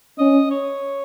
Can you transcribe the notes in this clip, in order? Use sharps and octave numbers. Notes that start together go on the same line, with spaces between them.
C#4 D#5
C#5